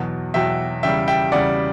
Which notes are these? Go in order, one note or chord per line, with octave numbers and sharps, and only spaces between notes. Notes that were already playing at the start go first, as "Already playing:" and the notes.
Already playing: E2 B2 F#3
E2 B2 F#3 E5 G5
E2 C#3 G3 E5 G5
E5 G5
E2 C#3 G3 D5 F#5